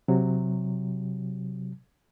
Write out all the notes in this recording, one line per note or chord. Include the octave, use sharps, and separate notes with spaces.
C3 F#3